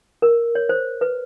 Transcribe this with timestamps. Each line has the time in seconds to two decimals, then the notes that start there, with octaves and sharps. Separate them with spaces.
0.22 A#4
0.55 C#5
0.69 C5
1.01 B4